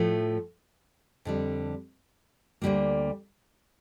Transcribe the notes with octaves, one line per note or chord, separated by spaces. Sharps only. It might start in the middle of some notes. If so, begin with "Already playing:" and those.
Already playing: A2 F3 A3
F2 D3 G3
D2 D3 G3 A#3